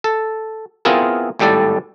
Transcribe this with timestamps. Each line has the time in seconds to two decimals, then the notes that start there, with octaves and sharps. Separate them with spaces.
0.04 A4
0.85 B3 C4 E4 F4 G#4 A#4
1.39 G#1 A2 G3 A4 D5